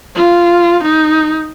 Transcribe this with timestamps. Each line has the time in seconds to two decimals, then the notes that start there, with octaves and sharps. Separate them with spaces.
0.15 F4
0.83 D#4